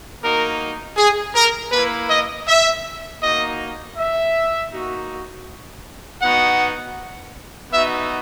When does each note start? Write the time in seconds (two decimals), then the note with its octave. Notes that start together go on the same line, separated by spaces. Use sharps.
0.22 A#3 D#4 F#4 A#4
0.97 G#4
1.35 A#4
1.72 A#3 E4 B4
2.10 D#5
2.47 E5
3.22 A#3 D#4 F#4 D#5
3.97 E5
4.72 A#3 D#4 F#4
6.22 B3 D#4 F#4 F#5
7.72 B3 D#4 F#4 E5